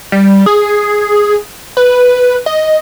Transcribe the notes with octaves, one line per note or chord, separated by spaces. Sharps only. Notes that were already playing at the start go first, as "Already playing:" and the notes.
G3
G#4
B4
D#5